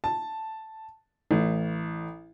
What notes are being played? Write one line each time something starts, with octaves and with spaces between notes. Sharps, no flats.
A5
A1